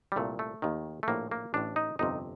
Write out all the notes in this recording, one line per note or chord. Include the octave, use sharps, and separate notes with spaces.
G3
C2 A#2 A3
A3
D#2 D#3
A3
A#1 A2 A#3
A#3
A1 A2 D4
D#4
G1 F2 C3 D#4